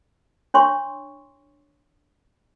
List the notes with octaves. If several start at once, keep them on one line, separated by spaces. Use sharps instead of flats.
D4 C#5 C6 C#6